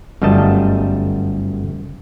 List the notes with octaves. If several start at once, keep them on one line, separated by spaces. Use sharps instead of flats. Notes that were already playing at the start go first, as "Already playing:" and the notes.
G1 F#2 G3 A3 D#5 A5